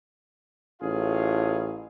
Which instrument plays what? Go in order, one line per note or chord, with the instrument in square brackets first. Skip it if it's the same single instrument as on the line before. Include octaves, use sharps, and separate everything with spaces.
[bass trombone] A1 [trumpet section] F4 G#4 F5